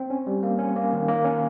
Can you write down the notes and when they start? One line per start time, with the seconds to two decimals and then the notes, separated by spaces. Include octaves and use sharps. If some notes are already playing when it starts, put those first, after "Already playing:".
Already playing: C4
0.10 C#4
0.27 G3
0.43 A#3
0.58 C#4
0.76 A#3
0.93 D#3
1.08 A#3
1.24 C#4